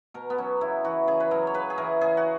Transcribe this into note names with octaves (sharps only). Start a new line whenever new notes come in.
B2 A#4
B3
F#3 C#4
C#3 E4
E3 F#4
C#3 G#4
B4
F#3 A#4
C#5
C#3 B4
G#4
E3 A#4
C#3 G#4
F#4